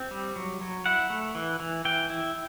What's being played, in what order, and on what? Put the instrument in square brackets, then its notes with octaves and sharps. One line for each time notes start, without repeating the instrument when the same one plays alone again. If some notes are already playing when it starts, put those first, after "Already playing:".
Already playing: [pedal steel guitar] C4
G3
F#3
F#3
E4 F#5
A3
E3
E3
E3 G5
E4